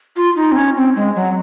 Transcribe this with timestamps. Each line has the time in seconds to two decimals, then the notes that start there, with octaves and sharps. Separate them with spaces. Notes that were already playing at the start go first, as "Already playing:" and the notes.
0.16 F4
0.36 D#4
0.52 C4
0.56 C#4
0.76 C4
0.96 G#3
1.15 F#3